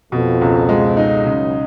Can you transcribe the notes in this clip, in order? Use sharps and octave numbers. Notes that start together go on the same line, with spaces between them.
F2 B2
C#2
G#3
D#4
F#2 C#3